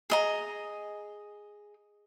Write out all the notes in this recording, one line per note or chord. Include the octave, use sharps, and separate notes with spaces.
G#4 D#5 A#5